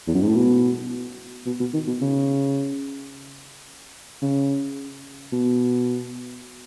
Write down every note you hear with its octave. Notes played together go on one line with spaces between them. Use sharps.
E2
F#2
G#2
A2
B2
B2
B2
D#3
B2
C#3
C#3
B2